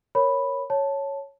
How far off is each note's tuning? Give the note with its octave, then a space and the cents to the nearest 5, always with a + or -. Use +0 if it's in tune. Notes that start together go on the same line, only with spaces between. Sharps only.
A#4 +0 C#5 -5 B5 +0
C#5 +0 A5 +0